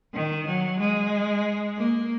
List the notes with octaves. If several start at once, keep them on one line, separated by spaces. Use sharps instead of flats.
D#3
F#3
G#3
A#3